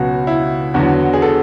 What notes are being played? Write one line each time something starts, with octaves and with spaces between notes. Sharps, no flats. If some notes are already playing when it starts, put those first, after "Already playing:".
Already playing: C#2 B2 F#3 F#4
E4
E2 D3 F#3 F#4
G#4
A4